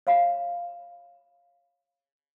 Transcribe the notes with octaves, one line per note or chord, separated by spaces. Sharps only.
C#5 F5 B5